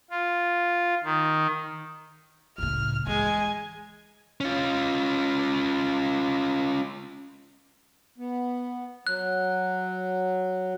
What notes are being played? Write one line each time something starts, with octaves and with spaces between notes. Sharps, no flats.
F4
D#3
C#2 A2 F6
E3 G#3 G#5
C#4 F4
B3
F#3 F#6